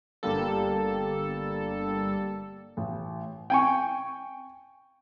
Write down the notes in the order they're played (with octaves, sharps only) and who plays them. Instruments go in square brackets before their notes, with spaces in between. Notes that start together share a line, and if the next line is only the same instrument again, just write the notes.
[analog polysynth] G1 D3 G3 A#3 A4
[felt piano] A1
[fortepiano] G5 G#5 C#6